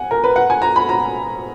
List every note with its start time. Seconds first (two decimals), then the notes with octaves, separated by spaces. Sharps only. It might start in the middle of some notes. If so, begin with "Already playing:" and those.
Already playing: F#5 G#5
0.11 A#4
0.24 B4
0.36 F#5
0.50 G#5
0.62 A#5
0.76 B5
0.89 A#5